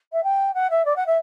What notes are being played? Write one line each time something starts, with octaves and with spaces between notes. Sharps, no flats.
E5
G5
F#5
E5
D5
F#5
E5